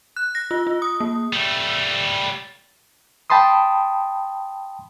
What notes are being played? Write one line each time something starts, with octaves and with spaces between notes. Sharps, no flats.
F#6
A#6
F4
F4
D#6
A#3
G3 A3
G5 A5 B5 C6 D#6